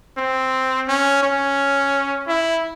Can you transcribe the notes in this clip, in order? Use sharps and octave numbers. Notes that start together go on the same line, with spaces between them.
C4
C#4
C#4
E4